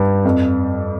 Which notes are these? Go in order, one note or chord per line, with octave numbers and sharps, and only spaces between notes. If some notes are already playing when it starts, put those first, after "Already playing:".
Already playing: G2
F2